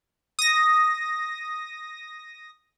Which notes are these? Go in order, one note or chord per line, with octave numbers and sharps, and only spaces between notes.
D#6 A#6